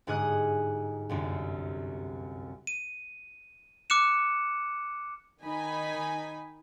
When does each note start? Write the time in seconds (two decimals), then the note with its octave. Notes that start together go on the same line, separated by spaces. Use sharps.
0.07 G1 G#2 F#5 G#5 D#6 F#6
1.09 G1 C2 F#2
2.67 D#7
3.90 D6 F6 F#6 C#7 E7
5.41 D#3 D#4 G#5 B5